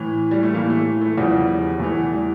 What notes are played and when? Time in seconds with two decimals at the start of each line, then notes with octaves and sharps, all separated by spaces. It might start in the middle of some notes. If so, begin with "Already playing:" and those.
Already playing: A2 E3
0.31 G3
0.43 A3
0.55 A2 E3 A#3
0.70 A3
1.01 A3
1.17 E2 C#3 F3 G3
1.79 E2 E3 A3
1.95 A3
2.12 G3